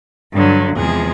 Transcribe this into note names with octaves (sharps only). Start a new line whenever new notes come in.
G2 D3 F#3
E2 C3 F3 G#3 G#4